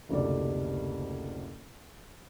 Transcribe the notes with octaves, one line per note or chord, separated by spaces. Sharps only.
F#1 D2 C3 A3 G4 D5